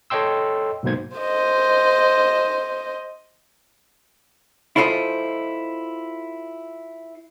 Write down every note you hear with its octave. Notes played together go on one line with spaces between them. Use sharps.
A4 C#5 D#5 G5 C6 E6
B1 G#2 B2 A#3 C5 G#6
C5 D#5
E4 F4 A4 A#4 C5 D#5